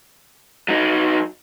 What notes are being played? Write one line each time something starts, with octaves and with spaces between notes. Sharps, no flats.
F#3 D#4